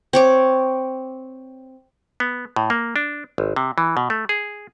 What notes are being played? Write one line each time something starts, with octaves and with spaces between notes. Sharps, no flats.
C4 C#5 D6
B3
A2
A#3
D4
G#1
C3
E3
B2
A3
G#4